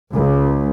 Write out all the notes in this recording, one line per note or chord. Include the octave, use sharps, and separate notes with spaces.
C#2